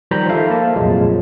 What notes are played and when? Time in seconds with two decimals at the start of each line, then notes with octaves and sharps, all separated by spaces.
0.11 D#3 F3 G3 A#5 B5 G6
0.29 D#4 A4 C5 E5 F5 A5
0.50 A#3 A5
0.76 C2 F2 A#2 F3 F#3 G#3